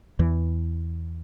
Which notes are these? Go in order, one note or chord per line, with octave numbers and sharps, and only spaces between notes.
E2 E3